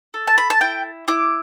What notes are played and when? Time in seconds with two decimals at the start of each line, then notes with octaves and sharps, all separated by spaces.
0.14 A4
0.27 A5
0.38 B5
0.50 A5
0.61 E4 G5
1.08 E4 D6